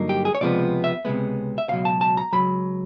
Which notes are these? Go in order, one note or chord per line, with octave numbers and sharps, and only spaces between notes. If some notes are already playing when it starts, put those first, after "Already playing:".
Already playing: G2 D3 F#3 A#3 D#4
G4
G#4
C#5
C#2 C3 F3 G#3 B3 D5
E5
C#2 C3 F3 G#3 B3
E5
C#2 B2 F#3 F5
A5
A5
A#5
C#2 B2 F#3 B5